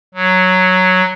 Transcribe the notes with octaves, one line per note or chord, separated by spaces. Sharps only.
F#3